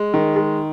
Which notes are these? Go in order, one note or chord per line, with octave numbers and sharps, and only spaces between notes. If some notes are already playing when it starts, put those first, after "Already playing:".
Already playing: G#3
D#3
G#3